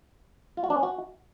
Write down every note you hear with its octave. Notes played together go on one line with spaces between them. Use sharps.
F4
F#4
D4
C#4
F#4